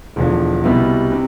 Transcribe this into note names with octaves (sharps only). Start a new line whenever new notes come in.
E1 E2 D3 F3
C2 B2 G3 B3 E4
C3